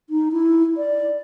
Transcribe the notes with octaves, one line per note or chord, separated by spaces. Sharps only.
D#4
E4
D5